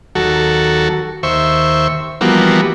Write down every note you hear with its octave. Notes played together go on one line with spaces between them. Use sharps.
D#2 F#3 F#4 A4
D#2 C5 E5 C#6
E3 F3 G3 A#3 B3 F#4